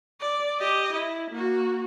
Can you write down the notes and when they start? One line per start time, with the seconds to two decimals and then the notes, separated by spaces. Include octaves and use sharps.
0.20 D5
0.59 G4 D#5
0.93 E4
1.31 A#3 F#4